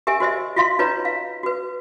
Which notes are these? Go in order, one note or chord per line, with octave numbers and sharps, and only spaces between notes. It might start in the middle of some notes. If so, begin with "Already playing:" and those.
G4 A#4 E5 G#5
F#4 C5 D#5 E5
F4 F#4 E5 F5 C6
D#4 F4 B4 C#5 D#5 A#5
F5
F#4 B4